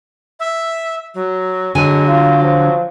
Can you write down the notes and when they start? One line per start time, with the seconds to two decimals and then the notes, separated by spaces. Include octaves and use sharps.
0.40 E5
1.14 F#3
1.75 D3 F#3 G#3 G#5
2.07 F4
2.42 F3